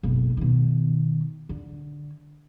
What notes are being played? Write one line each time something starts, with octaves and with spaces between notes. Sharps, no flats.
F#1 B1
B2 D#3
D3